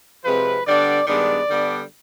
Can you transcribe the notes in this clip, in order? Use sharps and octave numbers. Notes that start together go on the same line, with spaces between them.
C3 F3 G#3 C4 B4
D3 G3 B3 D4 D5
G2 D#3 G#3 B3 D4 D5
D3 G3 B3 D4